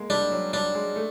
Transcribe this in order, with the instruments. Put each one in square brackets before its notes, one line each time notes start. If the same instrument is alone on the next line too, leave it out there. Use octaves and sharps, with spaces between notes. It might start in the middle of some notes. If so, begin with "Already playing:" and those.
Already playing: [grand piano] G#3 A#3
[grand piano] G3 [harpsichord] D4
[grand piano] F#3
[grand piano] G3 [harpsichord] D4
[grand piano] G#3
A3